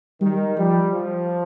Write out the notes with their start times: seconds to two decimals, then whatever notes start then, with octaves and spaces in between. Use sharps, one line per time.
0.21 D#3 G3
0.57 F3 G3
0.93 F3